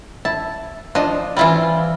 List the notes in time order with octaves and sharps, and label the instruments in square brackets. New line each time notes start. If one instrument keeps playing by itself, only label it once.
[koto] E4 [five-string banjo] A5
[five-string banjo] F3 D#5 [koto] D4
[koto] E3 E4 D5 [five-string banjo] G3 C4 F4